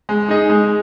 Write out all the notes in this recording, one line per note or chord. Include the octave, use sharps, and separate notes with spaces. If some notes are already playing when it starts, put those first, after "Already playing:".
G#3
D#4 G#4 D#5
G#3